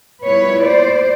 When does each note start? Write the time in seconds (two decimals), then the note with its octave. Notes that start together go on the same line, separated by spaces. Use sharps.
0.23 A#2 G3 B3 E4 B4 C#5
0.65 C5 D5